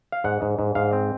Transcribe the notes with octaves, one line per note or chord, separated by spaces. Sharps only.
F5
G#2 F#5
G#2
G#2
G#2 F5
C4